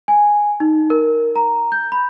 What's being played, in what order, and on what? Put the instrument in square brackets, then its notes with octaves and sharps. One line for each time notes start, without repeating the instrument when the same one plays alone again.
[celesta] G#5
D#4
A#4
A#5
G6
B5